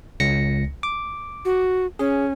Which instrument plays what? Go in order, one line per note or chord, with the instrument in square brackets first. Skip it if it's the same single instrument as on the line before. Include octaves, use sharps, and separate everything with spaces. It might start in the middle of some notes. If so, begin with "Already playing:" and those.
[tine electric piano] C#2 A#6 C#7
D6
[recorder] F#4
[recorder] C#4 [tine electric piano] G#4